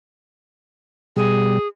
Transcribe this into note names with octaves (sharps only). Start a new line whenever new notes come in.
B2 G3 G#4